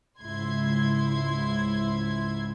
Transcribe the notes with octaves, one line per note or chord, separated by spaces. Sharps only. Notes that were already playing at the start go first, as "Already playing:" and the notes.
C#2 G#2 E4 C6 G#6